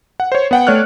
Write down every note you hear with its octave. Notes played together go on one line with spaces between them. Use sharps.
F#5
C5 C#5
B3 F#5 G5
A3 C#5 D5 F6 F#6